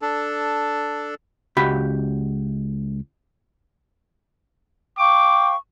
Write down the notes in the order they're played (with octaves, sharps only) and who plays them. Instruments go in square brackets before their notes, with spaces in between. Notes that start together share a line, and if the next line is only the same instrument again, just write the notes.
[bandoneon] D4 A4
[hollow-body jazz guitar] C#2 F#4 G4 B5
[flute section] F5 G5 C#6 [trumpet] D6